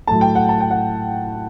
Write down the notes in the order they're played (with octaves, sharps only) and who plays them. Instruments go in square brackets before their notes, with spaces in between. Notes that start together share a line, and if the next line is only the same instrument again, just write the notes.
[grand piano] A2 F#3 A3 A5
G5
F#5
A5
G5
F#5